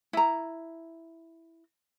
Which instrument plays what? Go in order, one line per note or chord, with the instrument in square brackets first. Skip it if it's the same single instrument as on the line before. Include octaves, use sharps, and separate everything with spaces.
[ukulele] E4 A#5